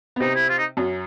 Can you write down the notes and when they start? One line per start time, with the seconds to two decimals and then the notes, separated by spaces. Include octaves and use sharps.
0.16 B3
0.20 C3 C4 D#4
0.35 E4
0.49 F4
0.58 D#4
0.77 F#2 F#3